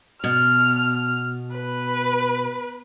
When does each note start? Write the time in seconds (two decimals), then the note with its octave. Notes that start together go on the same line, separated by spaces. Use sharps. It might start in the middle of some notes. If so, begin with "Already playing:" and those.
0.24 B2 F6
1.56 B4